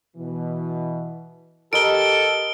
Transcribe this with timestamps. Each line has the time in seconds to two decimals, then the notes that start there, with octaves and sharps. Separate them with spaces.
0.16 B2 E3
1.73 G4 A4 A#4 D#5 B5 D7 G7